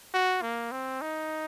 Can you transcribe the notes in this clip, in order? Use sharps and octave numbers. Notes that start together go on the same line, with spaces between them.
F#4
A#3
C4
D#4